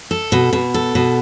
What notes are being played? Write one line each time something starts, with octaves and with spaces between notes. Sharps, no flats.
A4
B2
B2
A4
B2